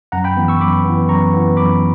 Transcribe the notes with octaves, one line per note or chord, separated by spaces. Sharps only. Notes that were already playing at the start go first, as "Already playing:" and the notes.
F#2 F#5 A#5
G5 B5
E3 B3
C#6 E6
F#2 B5 D6
B3
E3
F#2 A#5 C#6
E3 B3
F#2 B5 D6